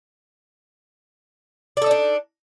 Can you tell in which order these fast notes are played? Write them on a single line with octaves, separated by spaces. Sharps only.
D5 A4 D#4 D4